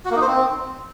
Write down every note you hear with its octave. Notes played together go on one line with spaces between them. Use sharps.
F#4
A#3
D#4
C5
C4